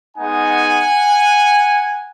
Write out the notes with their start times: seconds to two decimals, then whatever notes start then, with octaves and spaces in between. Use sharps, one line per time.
0.17 G#3 B3 D#4 F#5 G#5